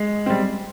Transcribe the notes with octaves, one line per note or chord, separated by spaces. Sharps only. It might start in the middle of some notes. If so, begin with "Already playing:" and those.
Already playing: G#3
G3 C4